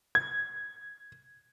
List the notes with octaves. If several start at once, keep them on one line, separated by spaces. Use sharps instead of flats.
G#6